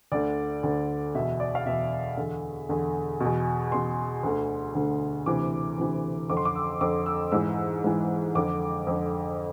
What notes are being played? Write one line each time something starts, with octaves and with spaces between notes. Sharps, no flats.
D2 D3 D5
D2 D3
E2 B2 E5
D5
F5
E2 B2 E5
E2 D3
E2 D3
E2 B2
E2 B2 C6
D2 D3
D2 D3
D2 C3 E3 D6
D2 C3 E3
F2 D3 D6
C6
D6
E6
F2 D3 D6
E6
G#2 E3 E6
G#2 E3
F2 D3 D6
F2 D3